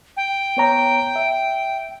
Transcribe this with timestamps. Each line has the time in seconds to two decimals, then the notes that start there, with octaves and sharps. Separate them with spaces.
0.17 G5
0.57 B3 C#5 A#5
1.16 E5